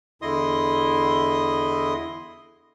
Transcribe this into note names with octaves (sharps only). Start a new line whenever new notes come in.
E2 D3 E4 D#5 C6 D#6